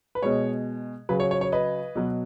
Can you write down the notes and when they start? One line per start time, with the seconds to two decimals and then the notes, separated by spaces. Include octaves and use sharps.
0.15 B4
0.22 B2 G#3 C#5
1.09 C#3 F#3 B4
1.20 C#5
1.31 C#5
1.41 C#5
1.52 B4 D#5
1.95 B2 F#3